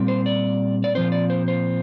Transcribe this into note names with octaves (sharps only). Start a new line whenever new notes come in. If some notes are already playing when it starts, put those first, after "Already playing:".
Already playing: A#2 G3 C4
C5
D5
D5
A#2 F3 C4 C5
D5
C5
C5